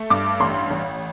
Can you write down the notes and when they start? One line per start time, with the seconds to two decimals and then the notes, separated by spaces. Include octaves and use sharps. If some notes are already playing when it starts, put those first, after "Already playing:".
Already playing: A3
0.10 G2 D6
0.40 A1 C6
0.71 A1